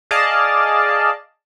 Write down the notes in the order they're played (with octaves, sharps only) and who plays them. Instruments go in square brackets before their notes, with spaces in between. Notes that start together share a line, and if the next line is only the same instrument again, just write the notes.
[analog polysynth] G#4 D5 D#5 F5 A5